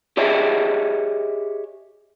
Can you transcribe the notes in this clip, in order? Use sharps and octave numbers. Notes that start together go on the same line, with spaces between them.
G4 G#4 C#5 D#5 E5